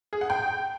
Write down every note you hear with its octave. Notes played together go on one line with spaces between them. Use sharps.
G#4
F#5
G5